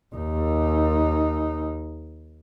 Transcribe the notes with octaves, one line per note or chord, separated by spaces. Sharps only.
D#2 D#4